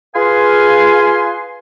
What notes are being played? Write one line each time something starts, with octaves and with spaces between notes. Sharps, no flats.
F4 G#4 B4 F5 G#5 C6